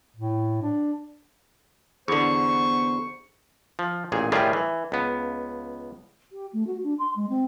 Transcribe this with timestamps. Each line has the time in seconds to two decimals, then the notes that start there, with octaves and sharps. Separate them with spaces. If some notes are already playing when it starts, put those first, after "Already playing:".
0.16 A2
0.63 D4
2.08 E2 D3 B3 C5 C#6
3.79 F3
4.12 A1 A#2 G#4
4.32 A2 D#3 G3 F4 G#4
4.53 E3
4.92 C#2 B3
6.32 G4
6.53 A3
6.66 F#4
6.83 D4
6.99 C6
7.15 G#3
7.29 C4